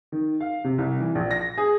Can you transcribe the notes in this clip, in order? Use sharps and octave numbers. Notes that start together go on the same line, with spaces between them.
D#3
F5
C3
C2
E3
A#1
A#6
G#4